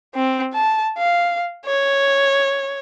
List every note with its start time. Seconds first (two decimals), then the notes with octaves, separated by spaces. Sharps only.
0.15 C4
0.54 A5
0.98 F5
1.66 C#5